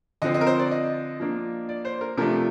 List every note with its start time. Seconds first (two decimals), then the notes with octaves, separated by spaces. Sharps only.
0.22 D3 F3 C4 D#5
0.34 D#5
0.41 A#4
0.47 C5
0.59 D5
0.71 D#5
1.20 F3 A#3 D4
1.69 D5
1.85 C5
2.01 A#4
2.17 C3 F3 A3 D4 A#4